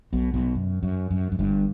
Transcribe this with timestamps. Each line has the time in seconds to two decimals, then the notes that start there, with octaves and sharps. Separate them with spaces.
0.13 B1 B2
0.34 B1 B2
0.55 F#2
0.83 F#2
1.11 F#2
1.32 F#2
1.39 G1 G2